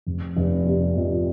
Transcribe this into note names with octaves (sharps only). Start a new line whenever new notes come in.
F1
F1
C3
F2